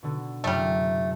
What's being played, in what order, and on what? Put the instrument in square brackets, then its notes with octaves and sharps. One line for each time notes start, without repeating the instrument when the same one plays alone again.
[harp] B2 D3
[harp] F#1 F#2 C3 [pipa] G3 A3